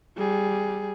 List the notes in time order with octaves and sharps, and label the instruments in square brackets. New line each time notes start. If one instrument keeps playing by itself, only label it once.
[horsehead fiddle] G3 G#4